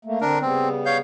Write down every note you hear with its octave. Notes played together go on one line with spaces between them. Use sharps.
A3 A#3
D3 C4 D4 A#4
C#3 G3 B3 C4
C#5 F5 G6